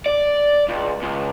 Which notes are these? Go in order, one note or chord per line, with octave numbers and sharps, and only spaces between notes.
D5
C#2
C#2